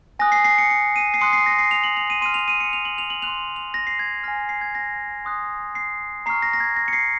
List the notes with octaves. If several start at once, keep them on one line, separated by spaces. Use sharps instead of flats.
G#5 D#6 F#6 A#6
C7
C7
C#7
C#7
D#7
C7
C6 D#6 F#6 C#7
C7
A#6
C7
F7
F#7
F7
D#7
C6 F6 D#7
F7
D#7
C#7
F7
F#7
F7
F#7
C6 F#6 F7
F7
A#6
C7
G#6
G#5 C6 F6 A#6
C7
G#6
A#6
C6 D#6 F#6
C7
A#5 C#6 F6 C7
A#6
A#6
G#6
A#6
C#7
C7